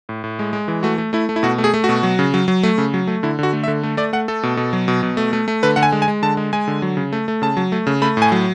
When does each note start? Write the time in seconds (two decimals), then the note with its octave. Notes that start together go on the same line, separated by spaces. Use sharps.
0.09 A2
0.24 A2
0.39 G#3
0.53 G#3
0.68 E3
0.83 A3 F#4
0.98 A3
1.13 A3 E4
1.29 A3
1.36 E4
1.43 B2 F#4
1.58 A3
1.64 G#4
1.74 A3
1.84 F#4
1.89 B2
2.03 F#3
2.19 C#3
2.34 F#3
2.48 F#3
2.63 A3
2.78 C#3
2.94 F#3
3.07 A3
3.23 D3 E4
3.39 D3 F#4
3.53 A3
3.64 E5
3.68 D3
3.83 A3
3.97 A3 D5
4.13 A3 F#5
4.28 A3 A4
4.43 B2
4.57 B2
4.73 F#3
4.88 B2
5.03 B2
5.17 A3
5.33 A3
5.48 A3
5.63 D3 B4
5.76 D3 F#5
5.83 G#5
5.92 G#3
6.02 G#5
6.08 G#3
6.22 D3 A5
6.37 G#3
6.53 G#3 G#5
6.68 D3
6.82 F#3
6.97 C#3
7.12 A3
7.28 A3
7.42 C#3 A5
7.57 F#3
7.72 A3
7.87 C#3
8.02 A3 B5
8.17 A2 G#5
8.32 F#3